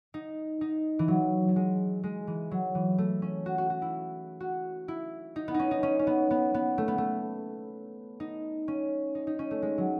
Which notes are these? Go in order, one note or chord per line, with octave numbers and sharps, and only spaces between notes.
D#4
D#4
E3
F#3
F#3
G#3
G#3
E3
F#3
E3
A3
C#4
F#4
F#4
F#4
E4
F#4
E4
D#4
B3
D#4
C#4
D#4
C#4
C#4
B3
B3
B3
A3
B3
A3
D#4
C#4
D#4
D#4
C#4
A3
G#3
F#3